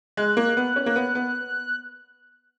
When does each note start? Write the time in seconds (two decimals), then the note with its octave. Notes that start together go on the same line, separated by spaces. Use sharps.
0.17 G#3 F#6
0.37 A#3
0.57 B3
0.76 C#4
0.86 A#3
0.96 B3
1.15 B3